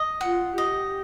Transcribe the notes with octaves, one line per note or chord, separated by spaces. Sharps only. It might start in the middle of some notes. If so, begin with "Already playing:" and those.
Already playing: D#5
F4 F#5
G4 D#5